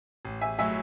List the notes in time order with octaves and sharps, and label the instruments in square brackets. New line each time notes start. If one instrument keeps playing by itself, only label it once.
[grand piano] A1
[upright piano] E5 G#5
[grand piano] A2 F#3 [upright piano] E5 G#5